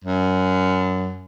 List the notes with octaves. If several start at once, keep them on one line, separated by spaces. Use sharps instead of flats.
F#2